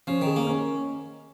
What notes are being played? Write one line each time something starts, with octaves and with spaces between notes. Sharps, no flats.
F3 C#4
D#3
G#4
A#3
C#4